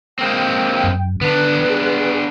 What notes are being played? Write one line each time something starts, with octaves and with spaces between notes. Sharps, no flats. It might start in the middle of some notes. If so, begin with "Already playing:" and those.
G#3 A#3 C4 G5
F#2
D3 B3 D4 B4
G#4